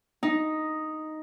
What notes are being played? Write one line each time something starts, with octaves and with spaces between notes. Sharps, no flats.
D#4